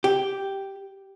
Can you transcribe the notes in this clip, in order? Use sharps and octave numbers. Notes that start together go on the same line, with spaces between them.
G4